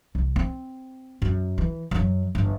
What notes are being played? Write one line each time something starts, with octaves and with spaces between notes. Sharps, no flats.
C2
C4
F#2
E3
F#2 F#3
G1